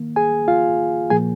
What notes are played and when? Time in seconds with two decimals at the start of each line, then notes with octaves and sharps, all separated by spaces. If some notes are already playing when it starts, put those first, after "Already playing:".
Already playing: D#3 A#3
0.16 G#4 G#5
0.48 F4 F5
1.10 A#2 F3 A#3 G#4 G#5